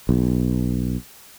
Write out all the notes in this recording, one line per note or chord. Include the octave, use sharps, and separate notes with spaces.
B1